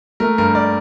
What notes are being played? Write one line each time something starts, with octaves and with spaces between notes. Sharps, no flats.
A3 A#4
G2 A#4
D5